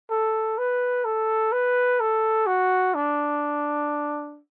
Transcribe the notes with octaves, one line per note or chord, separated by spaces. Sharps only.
A4
B4
A4
B4
A4
F#4
D4